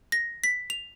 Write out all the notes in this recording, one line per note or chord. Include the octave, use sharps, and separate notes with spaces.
A#6
B6
F7